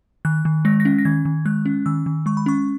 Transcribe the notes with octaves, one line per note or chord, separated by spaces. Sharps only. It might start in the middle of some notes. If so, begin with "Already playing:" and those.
D#3 F#6
D#3
G#3 A#6
A#6
C#4
A#6
D#3 G#6
D#3
G#3 F#6
C#4
D#3 E6
D#3
G#3 C#6
B5
C#4 C#6